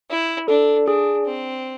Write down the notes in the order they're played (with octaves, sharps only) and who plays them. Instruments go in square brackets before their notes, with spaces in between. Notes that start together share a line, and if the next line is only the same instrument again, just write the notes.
[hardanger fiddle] E4
[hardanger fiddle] D4 [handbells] A4
[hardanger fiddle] D4 [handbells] G#4
[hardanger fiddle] C4